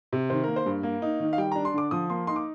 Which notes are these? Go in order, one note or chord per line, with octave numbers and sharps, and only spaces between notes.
C3
D#3 C5
A#3 A#4
C5
G2
A#3
D#4
D#3
F5
G3 G5
D4 A#5
C6
D3 D6
F3 D#6
A#3 C6
D#4 C6
D6